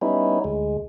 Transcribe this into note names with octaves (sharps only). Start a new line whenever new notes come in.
G3 B3 C#4 D#4 E4
D2 G#3